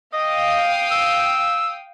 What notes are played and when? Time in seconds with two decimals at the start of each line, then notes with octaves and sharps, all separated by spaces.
0.13 D#5 F5 G5 D#6
0.92 E6